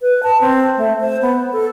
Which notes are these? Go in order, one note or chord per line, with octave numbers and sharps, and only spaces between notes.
B4
A5
C4
A3
C5
B3
A4